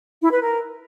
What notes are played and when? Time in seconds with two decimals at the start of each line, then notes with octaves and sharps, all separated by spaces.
0.22 E4
0.32 B4
0.42 A#4